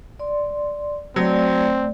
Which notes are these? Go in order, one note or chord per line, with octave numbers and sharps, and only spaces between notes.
D5 C6
F#3 A3 C4 D5